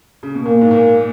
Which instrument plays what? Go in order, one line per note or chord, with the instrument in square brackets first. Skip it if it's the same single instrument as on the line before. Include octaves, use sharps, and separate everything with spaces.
[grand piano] C#3
B2
[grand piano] A#2 [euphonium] A#3
[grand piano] G#2
A#2